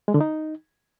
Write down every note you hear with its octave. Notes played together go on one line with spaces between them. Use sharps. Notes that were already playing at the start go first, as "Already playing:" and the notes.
G#3
D3
D#4